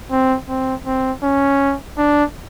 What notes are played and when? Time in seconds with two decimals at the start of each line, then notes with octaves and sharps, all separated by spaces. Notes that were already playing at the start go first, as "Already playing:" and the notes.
0.11 C4
0.49 C4
0.86 C4
1.23 C#4
1.98 D4